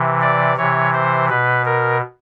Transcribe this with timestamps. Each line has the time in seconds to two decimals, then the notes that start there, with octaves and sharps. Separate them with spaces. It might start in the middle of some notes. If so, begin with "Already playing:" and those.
Already playing: C3 E3
0.21 D5
0.57 C3 E3 C#5
0.93 C5
1.29 B2 B4
1.65 A#4